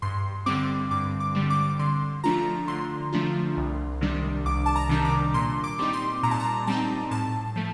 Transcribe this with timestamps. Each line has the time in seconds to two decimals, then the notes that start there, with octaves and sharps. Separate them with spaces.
0.02 G2 C6
0.46 D3 G3 C4 D6
0.91 G2 D6
1.20 D6
1.35 D3 G3 C4
1.50 D6
1.79 D3 C6
2.24 F3 A3 D4 F4 A#5
2.68 D3 C6
3.12 F3 A3 D4 F4
3.57 C2
4.01 C3 D#3 G3 D4
4.45 C2 D6
4.66 A5
4.76 A#5
4.89 C3 D#3 G3 D4
5.05 D6
5.34 A#2 C6
5.64 D6
5.79 G3 C4 D#4
5.93 C6
6.23 A#2 A#5
6.31 A5
6.40 A#5
6.67 G3 C4 D#4 A5
7.11 A2 A5
7.56 F3 A3